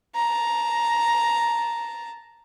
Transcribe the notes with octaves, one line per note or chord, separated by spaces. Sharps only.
A5 A#5